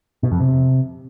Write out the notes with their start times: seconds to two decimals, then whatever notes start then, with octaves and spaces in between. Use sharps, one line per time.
0.23 B2
0.32 F2
0.40 C3